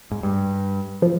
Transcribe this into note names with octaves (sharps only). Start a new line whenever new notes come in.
G#2
G2
F3